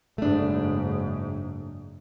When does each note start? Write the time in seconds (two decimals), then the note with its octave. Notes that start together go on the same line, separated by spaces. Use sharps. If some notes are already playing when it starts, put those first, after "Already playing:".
0.18 F#1 G#2 A3 D4